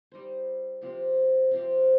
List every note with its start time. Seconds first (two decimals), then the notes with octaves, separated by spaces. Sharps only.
0.12 G3 D#4 C5
0.81 C3 F3 C4 G4
1.51 C3 F3 C4 G4